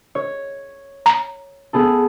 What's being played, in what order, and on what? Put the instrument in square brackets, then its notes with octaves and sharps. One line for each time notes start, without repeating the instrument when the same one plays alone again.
[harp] C#5
[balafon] A#5
[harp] B3 G#4 A4